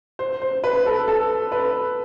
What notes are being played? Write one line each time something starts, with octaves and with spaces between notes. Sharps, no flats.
C5
C5
B4
A4
A4
B4